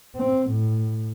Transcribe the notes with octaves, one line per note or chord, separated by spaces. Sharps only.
C4
A2